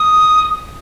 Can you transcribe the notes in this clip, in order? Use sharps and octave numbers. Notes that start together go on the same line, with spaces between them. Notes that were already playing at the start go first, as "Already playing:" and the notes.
Already playing: D#6